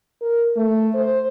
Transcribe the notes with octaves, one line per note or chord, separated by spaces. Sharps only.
A#4
A3
C5